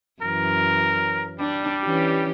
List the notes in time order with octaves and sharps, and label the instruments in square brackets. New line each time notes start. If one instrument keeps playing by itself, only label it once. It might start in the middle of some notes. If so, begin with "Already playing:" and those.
[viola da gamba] F#2 E3 [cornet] A#4
[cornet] G3 [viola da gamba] D4
[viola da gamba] E3 C#4 G4